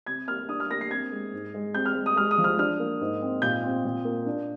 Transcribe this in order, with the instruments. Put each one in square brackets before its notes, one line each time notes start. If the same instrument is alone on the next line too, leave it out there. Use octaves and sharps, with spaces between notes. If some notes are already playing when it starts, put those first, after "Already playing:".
[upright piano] C3 G#6
A#3 F6
D4 D#6
F6
A#3 A#6
C7
C4 G#6
G#3
G#2
G#3
C4 G6
F6
G#3
D#6
G#3 F6
D#6
F3
F6
D4 F6
A#3
G#2
C4
A#2 G6
C4
A#2
A#3
D4